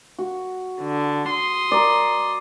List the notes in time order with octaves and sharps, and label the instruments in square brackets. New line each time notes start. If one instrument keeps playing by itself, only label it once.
[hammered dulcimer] F#4
[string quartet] D3
C6 D#6
[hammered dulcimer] D5 A#5